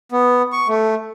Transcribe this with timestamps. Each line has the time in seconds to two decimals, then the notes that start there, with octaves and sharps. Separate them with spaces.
0.12 B3
0.52 C#6
0.68 A3